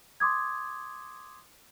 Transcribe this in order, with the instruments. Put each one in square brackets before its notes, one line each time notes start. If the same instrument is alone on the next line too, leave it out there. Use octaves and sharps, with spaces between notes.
[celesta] C6 D6 D#6 G#6